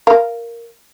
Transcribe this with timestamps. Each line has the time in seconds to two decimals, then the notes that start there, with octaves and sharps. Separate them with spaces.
0.07 A#4 F5